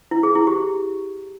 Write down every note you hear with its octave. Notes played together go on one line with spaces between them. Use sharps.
E4
G#4
E4
G4